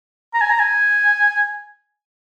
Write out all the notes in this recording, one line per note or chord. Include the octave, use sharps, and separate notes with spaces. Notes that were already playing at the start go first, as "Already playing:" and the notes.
A#5
G#5
A#5
G#5